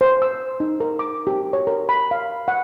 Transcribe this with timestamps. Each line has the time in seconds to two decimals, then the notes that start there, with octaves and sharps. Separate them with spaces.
0.01 C5
0.22 E6
0.60 D#4
0.80 A#4
0.99 D6
1.27 G4
1.53 C#5
1.67 A#4
1.89 B5
2.11 F5
2.48 F#5